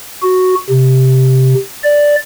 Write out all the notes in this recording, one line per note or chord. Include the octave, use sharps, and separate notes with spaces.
F#4
C3
D5